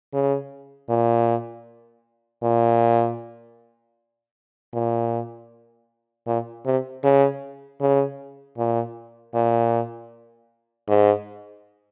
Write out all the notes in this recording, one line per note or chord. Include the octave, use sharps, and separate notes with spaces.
C#3
A#2
A#2
A#2
A#2
C3
C#3
C#3
A#2
A#2
G#2